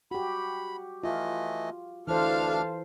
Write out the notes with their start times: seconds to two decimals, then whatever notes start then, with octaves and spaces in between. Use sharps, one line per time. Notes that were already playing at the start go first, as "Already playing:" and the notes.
0.11 F#4 G4 B5
1.04 E3 A3 F4 D#5
2.07 D2 E3 D4 A4 C5 F5 A5 F6